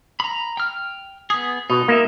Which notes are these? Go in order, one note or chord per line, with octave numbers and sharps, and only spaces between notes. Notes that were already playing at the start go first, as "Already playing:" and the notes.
A#5 B5
G5 F6
B3 G#4
B2 D#4
A#3 E5